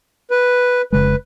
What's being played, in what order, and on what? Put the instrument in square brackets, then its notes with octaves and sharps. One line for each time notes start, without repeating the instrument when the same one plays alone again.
[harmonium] B4
[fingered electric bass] F1 C#3 G#3 [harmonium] B4